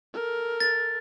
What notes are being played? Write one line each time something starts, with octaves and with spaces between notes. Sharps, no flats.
A4 A#4
A6